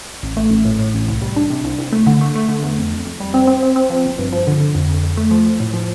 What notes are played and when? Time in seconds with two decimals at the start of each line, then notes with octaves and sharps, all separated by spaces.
0.23 A1
0.37 A3
0.51 A1
0.65 A2
0.79 A2
0.94 A1
1.08 C2
1.22 G3
1.36 D4
1.50 C3
1.64 C2
1.79 C2
1.93 A3
2.07 D3
2.21 A3
2.35 A3
2.48 D3
2.63 E2
2.78 F2
2.92 F2
3.06 F2
3.20 G3
3.34 C4
3.47 C4
3.63 C4
3.76 C4
3.90 F3
4.05 G1
4.19 G2
4.32 F3
4.47 D3
4.60 D3
4.75 F2
4.89 F2
5.03 F2
5.17 A3
5.31 F3
5.46 F3
5.60 A2
5.73 F3